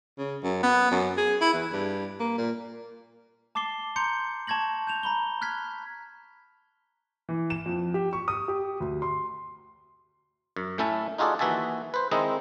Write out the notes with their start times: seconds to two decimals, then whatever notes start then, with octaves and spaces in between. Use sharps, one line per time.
0.18 C#3
0.43 F#2
0.63 B3
0.91 F#2
1.17 G#4
1.41 E4
1.54 E2
1.72 G2
2.20 A#3
2.38 A#2
3.55 A5 D6 A6 C7 G7
3.96 A#5 C6 G6 C#7
4.47 A5 C#6 G#6 A#6 F#7
4.87 G6 E7 F7
5.03 A#5 B5 G7
5.41 F6 F#6 G#6 B6
7.29 E3
7.50 E7
7.66 F2
7.94 G4
8.13 C#6
8.28 D#6
8.48 G4
8.80 D2
9.02 C6
10.57 F#2
10.78 A2 A3 C#4 E4 E5 A5
11.18 D#4 F4 F#4 G#4 A4 D5
11.39 D#2 E3 F#4 E5 G#5 A5
11.94 B4 C5
12.11 D#3 G#3 C4 D#4 E4 D#5